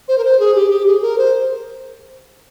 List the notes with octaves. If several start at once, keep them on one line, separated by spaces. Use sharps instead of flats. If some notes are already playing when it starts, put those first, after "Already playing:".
C5
A#4
C5
G#4
G4
G4
G#4
A#4
C5